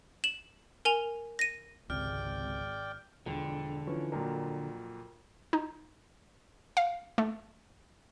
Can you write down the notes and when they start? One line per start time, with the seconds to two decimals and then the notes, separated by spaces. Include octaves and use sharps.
0.24 E7 F#7
0.85 A#4 G#5 F7
1.39 A#6 D#7
1.90 G#1 C#2 C3 D5 G5 F6
3.26 E1 F2 D3
3.87 E3 F3 C#4
4.12 F2 A#2 F#3 A#4
5.53 D#4
6.77 F5
7.18 A3